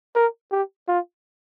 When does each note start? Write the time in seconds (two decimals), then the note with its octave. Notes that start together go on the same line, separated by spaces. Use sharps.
0.16 A#4
0.51 G4
0.88 F4